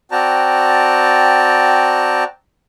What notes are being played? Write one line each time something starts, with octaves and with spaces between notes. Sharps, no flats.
C4 F#4 D5 G5 A5 A#5